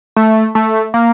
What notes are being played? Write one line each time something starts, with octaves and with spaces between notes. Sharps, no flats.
A3
A3
A#3